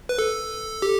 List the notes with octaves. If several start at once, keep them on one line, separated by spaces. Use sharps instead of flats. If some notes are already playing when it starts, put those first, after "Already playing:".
B4
A4
G4